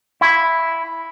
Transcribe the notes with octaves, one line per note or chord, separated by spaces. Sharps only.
E4